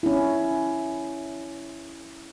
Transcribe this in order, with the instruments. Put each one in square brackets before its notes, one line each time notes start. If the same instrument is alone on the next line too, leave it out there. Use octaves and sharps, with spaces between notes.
[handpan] C#4 E4